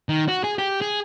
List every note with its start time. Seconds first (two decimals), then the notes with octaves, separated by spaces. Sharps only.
0.09 D#3
0.28 F#4
0.44 G#4
0.58 G4
0.82 G#4